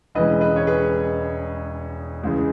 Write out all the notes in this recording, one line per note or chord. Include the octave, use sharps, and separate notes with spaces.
E1 E2 C#3 E3 G#3 B4 D#5
B4 D#5
C#5
G#4 B4
C#2 C#3 E3 G#3